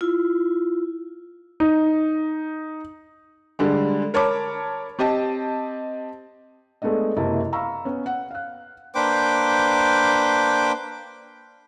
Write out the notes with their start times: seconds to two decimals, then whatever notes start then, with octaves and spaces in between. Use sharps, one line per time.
0.01 E4 F4
1.60 D#4
3.59 D3 G3 G#3
4.14 A#4 C#5 A5 B5 D6
4.99 C4 G4 D#5 A5
6.82 G#3 A3 B3 D4 D#5
7.17 F#1 C3 A#3 E4 D#5 A5
7.53 F5 A#5 B5 C#6 E6
7.85 B3 C#4
8.06 F#5
8.31 F5 F#6
8.95 A#3 D4 B4 C5 G5 D6